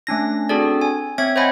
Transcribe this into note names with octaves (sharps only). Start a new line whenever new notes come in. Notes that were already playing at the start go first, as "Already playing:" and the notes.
A3 C#4 D4 A#6
C4 D4 F#4 G#4 A4 D5
G#5
C4 C#5 E5 G#6
C5 C#5 D#5 F#5 G#5 B5